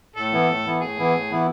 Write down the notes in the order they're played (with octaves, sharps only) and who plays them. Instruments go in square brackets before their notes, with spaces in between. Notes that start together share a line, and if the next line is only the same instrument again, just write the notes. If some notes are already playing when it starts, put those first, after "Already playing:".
[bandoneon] A2 [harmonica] A4
[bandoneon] E3 B3 E4
A2
E3 B3 E4
[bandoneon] A2 [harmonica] G#4
[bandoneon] E3 B3 E4
A2
E3 B3 E4